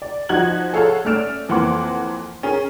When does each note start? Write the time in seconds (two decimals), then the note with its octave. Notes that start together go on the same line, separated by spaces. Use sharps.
0.02 D5
0.29 F3 D#4 F#4 F#6 G#6 F#7
0.73 G#4 A4 C#5 F5 F#5 A5
1.05 A3 C#4 D5 F6 D7 E7
1.49 F2 E3 A#3 F#5 C6 D6
2.43 C#4 G#4 A#4